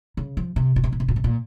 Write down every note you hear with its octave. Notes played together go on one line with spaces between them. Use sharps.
C#3
F3
C3
A#2
C3
A#2
C3
A#2
C3
A#2